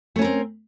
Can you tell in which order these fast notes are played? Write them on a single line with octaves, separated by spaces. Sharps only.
A3 C#4 A#4 C4